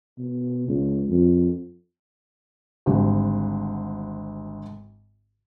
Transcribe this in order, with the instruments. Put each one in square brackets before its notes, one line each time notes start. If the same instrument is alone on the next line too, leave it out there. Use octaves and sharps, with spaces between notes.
[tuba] B2
C#2
F2
[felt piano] G#1 D2 D3 G3